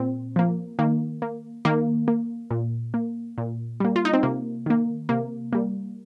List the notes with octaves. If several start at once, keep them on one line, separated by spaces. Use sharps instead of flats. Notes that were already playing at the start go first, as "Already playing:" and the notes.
Already playing: A#2 C4
F3 A#3
D#3 A#3
A#3
D#3 A#3
A#3
A#2
A#3
A#2
G3 A#3
F4
D#4
C4
C3 A#3
D#3 A#3
C3 A#3
G3 A#3